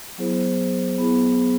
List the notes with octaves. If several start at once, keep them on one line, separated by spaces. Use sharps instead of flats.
F#3 B3 E4 G#4 C5
F#3 B3 E4 G#4 C5